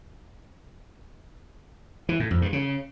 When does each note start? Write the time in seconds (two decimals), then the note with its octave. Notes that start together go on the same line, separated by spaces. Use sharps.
2.09 E3
2.20 A2
2.31 F2
2.42 G2
2.53 C#3